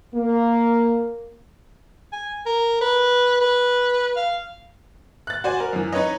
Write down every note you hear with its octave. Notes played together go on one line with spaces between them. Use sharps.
A#3
G#5
A#4
B4
B4
F5
F#6 A6
F#4 C5 D5 G#5
A#4
F#2 E3
D#4 B4 C#5 D#5